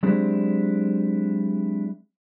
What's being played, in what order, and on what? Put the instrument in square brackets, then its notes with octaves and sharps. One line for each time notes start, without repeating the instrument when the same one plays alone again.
[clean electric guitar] F#3 G#3 C4 D4 E4 G4